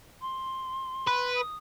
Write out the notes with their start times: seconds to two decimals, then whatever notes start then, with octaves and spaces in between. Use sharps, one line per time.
0.21 C6
1.07 B4
1.35 D#6